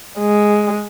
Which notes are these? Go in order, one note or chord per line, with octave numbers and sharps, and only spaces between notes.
G#3